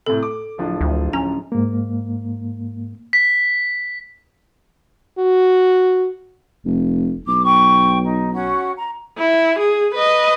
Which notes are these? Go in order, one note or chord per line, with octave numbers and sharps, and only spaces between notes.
A2 C3 A4
D6
D1 F3 D4
D2
C#4 A#5
G#2 A#3
B6
F#4
F1
B1 D6
G5 C#6
D#4
C#4 F#4 F#5
A#5
E4
G#4
B4 D#5